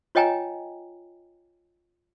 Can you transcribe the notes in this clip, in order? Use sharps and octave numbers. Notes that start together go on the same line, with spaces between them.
F4 C#5 D#5 G5 G#5 A#5